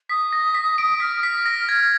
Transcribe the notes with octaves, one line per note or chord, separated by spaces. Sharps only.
D#6 B6
A#6
B6
D7
F6 B6
B6
A#6
G#6